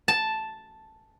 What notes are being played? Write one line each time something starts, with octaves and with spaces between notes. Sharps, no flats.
A5